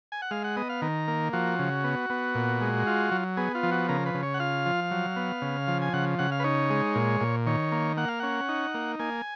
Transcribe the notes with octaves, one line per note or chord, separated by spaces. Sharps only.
G#5
F#5
G#3 F5
F#5
B3 D#5
F5
D#3 A#4
A#3
F3 F#4
C#3
B3
B3
A#2
G#3
F4
F#3
B3 G#4
F4
F3
F#4
C#3 A#4
B4
C#3
C#5
F#5
F4 F5
F3
F#3
B3
C#3
F3
G#5
C#3 F#5
C#3 F#5
F5
B4
D#4 C#5
G#3
A#2
A#2
D#3 C#5
A#3
A#3 F#5
F5
C#4 F#5
D#4
A#3
A#3 G#5